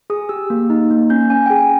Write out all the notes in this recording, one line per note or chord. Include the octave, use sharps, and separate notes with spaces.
G#4 D#6
G4 E6
A#3
D#4
A#3
C#4 G6
C#4 G#5
G5
G#4 G#5